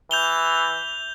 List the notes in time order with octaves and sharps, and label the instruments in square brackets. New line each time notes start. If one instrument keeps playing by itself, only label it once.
[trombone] E3 [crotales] G6 F7 G7